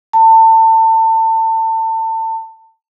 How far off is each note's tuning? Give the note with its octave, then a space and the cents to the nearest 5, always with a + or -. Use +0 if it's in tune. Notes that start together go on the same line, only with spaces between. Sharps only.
A5 +30